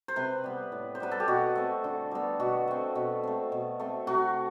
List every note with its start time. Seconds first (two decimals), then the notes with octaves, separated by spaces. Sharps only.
0.08 C5
0.16 C3 B4
0.44 G3 B3
0.72 A2
0.95 C5
1.00 G3 B3 B4
1.11 A4
1.20 G4
1.28 B2 F#4
1.55 A3 C4
1.84 D3
2.11 G3 B3
2.40 B2 F#4
2.68 A3 C4
2.95 B2
3.23 A3 C4
3.52 B2
3.80 A3 C4
4.07 C3 F#4